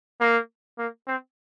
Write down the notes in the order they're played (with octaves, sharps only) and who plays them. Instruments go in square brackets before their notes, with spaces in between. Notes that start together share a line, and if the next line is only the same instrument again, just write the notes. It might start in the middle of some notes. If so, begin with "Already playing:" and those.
[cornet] A#3
A#3
C4